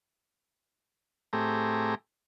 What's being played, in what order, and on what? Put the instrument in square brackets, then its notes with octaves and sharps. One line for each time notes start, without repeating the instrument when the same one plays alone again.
[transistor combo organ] A2 A3 C4 G4 G#4 A#5